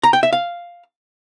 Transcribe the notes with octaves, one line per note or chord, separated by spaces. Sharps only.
A#5
G5
E5
F5